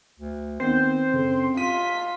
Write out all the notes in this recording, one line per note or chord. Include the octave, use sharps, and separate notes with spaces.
D2
D#3 B3 C4 C5
F#1 A4
F4 B6 D#7